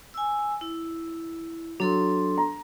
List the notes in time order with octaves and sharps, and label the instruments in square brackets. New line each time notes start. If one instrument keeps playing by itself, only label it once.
[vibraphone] G#5 E6
E4
[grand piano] F#3 [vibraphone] D4 A4 C6
[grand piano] A#5